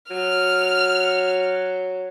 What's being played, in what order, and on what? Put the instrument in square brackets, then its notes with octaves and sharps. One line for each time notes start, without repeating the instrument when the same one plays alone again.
[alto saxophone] F#3 [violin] F6